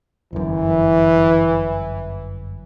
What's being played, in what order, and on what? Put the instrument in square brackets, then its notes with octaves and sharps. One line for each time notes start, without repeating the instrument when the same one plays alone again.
[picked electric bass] G1 F#2 [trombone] E3